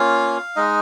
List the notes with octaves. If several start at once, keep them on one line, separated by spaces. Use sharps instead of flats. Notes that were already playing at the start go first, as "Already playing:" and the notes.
Already playing: A#3 C#4 F4 F5
G#3 D#4 D#5